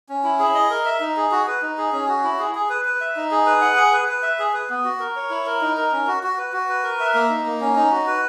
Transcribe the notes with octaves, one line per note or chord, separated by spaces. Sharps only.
C#4
E4
G#4
D#5
A#4
E5
D#4
G#4
F#4
B4
D#4
G#4
C#4
F#4
E4
G#4
G#4
B4
B4
E5
D#4
G#4
B4
F#5
G#4
B4
B4
E5
G#4
B4
B3
F#4
A#4
C#5
E4
A#4
D#4
A#4
C#4
F#4
F#4
B4
F#4
B4
A#4
E5
A#3
D#4
A#3
C#4
D#4
F#4
B4